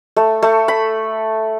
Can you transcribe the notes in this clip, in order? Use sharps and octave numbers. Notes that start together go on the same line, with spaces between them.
A3
A3
B5